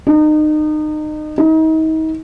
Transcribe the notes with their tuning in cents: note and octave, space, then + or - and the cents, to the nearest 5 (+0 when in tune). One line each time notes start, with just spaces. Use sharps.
D#4 -30
D#4 +35